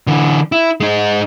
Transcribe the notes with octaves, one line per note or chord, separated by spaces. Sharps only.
D3 E3
E4
G#3 D#4